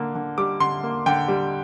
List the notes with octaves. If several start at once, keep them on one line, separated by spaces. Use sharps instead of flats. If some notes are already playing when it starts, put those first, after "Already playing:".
Already playing: D3 A#3
D3
G3 D6
D3 C6
A#3
D3 G5
G3